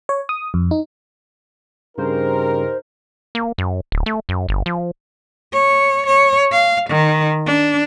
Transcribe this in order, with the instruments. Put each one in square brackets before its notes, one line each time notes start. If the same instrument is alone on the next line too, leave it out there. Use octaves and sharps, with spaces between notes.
[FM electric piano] C#5
D#6
F2
D#4
[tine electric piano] G2 C#3 [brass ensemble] D#4 G4 A#4 [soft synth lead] C5
[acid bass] A#3
F#2
D1
A3
F#2
G1
F3
[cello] C#5
C#5
F5
D#3
D4